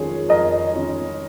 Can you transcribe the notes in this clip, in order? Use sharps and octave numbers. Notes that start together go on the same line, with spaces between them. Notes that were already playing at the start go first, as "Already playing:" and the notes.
Already playing: F2 D#3 C#4 F4 G#4 C#5
F2 A#4 D#5
D#3 C#4 F4